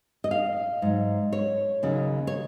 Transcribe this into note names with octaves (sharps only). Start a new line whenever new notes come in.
D#5
F5
G#2 F#3
C#5
D#2 C#3 F#3
C#5